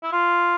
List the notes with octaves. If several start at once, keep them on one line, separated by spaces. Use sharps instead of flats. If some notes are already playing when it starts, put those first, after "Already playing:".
E4
F4